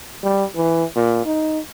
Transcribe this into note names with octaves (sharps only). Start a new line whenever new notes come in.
G3
E3
A#2
D#4